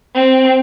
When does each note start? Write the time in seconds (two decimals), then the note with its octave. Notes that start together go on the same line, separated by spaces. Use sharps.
0.15 C4